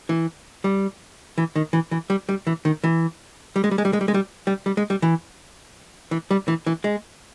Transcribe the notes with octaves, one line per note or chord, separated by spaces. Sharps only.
E3
G3
E3
D#3
E3
E3
G3
G3
E3
D#3
E3
G3
G#3
G3
G#3
G3
G#3
G3
G#3
G3
G3
G3
G#3
G3
E3
E3
G3
E3
E3
G#3